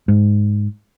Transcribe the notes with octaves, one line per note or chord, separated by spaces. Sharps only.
G#2